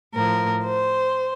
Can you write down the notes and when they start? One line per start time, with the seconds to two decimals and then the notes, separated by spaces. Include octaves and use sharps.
0.13 A2 F3 A#4
0.64 C5